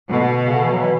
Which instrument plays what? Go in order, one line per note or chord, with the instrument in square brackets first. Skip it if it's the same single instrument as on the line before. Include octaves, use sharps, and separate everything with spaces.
[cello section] B2 [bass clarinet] D3
[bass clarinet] C#3
D3
E3
F#3
E3